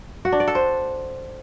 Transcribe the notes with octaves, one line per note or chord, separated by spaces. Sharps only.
F#4
D4
D5
A4
C5